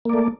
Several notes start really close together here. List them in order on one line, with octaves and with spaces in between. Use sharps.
A#3 D5 A3